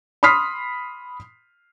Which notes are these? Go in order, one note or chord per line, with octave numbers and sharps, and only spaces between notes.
B5 C6 D#6 F6 B6 C7